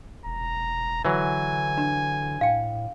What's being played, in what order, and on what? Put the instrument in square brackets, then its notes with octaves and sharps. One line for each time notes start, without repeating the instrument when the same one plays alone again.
[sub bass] E1 [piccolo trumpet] A#5
[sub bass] D3 [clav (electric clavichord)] E3 F#3 [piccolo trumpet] G#5
[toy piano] D4
[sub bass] A2 [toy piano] F5 G5